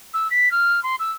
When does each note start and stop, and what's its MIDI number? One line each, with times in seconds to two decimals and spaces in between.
0.13 0.27 88
0.30 0.51 95
0.51 0.82 89
0.83 0.95 84
0.99 1.11 88